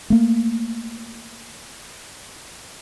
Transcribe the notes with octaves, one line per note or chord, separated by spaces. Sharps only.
A3 A#3